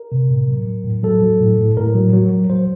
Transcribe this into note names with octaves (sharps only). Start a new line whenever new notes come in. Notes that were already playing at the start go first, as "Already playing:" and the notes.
Already playing: A#4
C3
A2
F#3
F#3
A2
F#3 A4
F#3
A2
A2
A2 A#4
F#3
F#3
F#3
F#3 C5